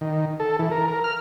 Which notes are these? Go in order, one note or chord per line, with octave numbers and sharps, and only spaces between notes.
D#3
A4
E3
A#4
A#4
F6